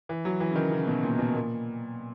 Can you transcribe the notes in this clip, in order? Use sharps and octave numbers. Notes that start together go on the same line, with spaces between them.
E3
F#3
E3
C#3
D#3
C#3
B2
A#2
B2
A#2